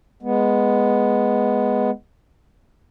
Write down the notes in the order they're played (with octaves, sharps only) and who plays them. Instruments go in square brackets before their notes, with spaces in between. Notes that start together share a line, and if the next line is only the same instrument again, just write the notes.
[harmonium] G#3 B3